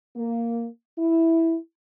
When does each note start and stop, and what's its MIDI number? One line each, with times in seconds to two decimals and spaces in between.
0.16 0.66 58
0.97 1.56 64